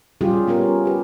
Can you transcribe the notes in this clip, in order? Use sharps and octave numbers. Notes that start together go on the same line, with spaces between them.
G3 C#4 F4 G4 G#4
B3 C#4 F4 A#4
G4 B4